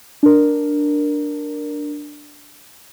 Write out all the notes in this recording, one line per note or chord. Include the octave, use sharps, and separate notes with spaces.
D4 A#4